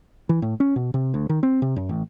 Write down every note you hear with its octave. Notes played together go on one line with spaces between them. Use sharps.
E3
A2
C#4
B2
C3
D2
D#3
C4
C3
F#2
A1